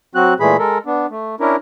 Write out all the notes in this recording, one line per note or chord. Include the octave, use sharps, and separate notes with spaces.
F#3 C4 F#4 F#6
A#2 E3 G#3 A3 G#4 B5
G#3 A4 A#4
B3 D4
A3
C#4 D4 E4 A#4